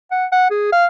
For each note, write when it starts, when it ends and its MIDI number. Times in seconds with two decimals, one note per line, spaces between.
0.11 0.25 78
0.32 0.49 78
0.51 0.72 68
0.72 0.86 77